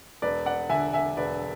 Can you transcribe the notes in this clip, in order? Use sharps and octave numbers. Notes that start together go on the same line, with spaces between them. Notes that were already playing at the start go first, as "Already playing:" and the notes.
E1 B4 D5
D5 F#5
D3 E5 G#5
E5 G#5
E1 B4 D5